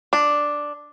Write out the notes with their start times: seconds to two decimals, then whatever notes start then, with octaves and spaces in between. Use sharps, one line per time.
0.13 D4